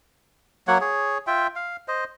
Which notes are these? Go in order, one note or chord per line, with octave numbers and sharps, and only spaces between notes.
F#3 A#3 C#5 F#5
G#4 C#5
F4 E5 G5
F5
C5 D#5